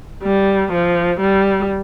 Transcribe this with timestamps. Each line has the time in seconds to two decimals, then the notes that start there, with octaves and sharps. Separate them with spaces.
0.23 G3
0.72 F3
1.20 G3